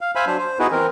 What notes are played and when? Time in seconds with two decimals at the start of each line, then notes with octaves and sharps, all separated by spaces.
0.01 F5
0.15 C5 E5 F5 G#5 B5
0.27 F#3 D4 C5
0.39 C5
0.59 B3 D#4 E4 F#4 G#4 B4
0.71 E3 C4 A#4